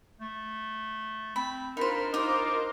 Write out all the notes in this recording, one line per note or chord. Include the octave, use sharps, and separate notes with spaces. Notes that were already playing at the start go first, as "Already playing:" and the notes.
A3
C4 B5
D4 D#4 F4 A#4 C5 B5
D#4 F4 A#4 C5 D6